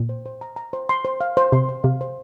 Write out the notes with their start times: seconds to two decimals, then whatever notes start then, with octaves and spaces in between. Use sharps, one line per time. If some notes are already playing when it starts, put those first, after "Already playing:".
Already playing: A#2
0.09 C5
0.26 C5
0.41 A#5
0.56 A#5
0.73 C5
0.89 C6
1.05 C5
1.21 F5
1.37 C5
1.52 C3 C6
1.69 C5
1.84 C3 F5
2.01 C5